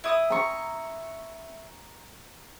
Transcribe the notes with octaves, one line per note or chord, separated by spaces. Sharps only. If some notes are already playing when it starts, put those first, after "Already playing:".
E4 D#6
A#5 C#6